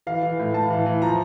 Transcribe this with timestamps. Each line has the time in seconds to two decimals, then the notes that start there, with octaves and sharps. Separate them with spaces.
0.07 E3 F5
0.23 E3
0.39 A2
0.54 A2 A5
0.70 E3
0.86 E3
1.02 F3 A#5